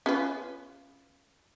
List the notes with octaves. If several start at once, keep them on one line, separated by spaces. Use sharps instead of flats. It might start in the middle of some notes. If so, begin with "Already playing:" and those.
C#4 F4 B4